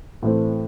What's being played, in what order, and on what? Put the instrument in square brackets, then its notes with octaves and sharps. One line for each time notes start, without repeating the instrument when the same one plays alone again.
[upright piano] A2 E3 A3 C4